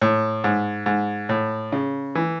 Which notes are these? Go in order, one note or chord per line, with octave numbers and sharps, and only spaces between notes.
A2
G#2
G#2
A2
C#3
E3